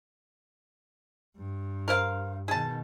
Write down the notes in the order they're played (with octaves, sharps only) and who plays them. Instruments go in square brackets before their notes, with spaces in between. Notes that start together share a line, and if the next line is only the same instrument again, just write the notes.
[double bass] G2
[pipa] A#4 C5 F5
[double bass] B2 D#3 [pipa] G#4 A5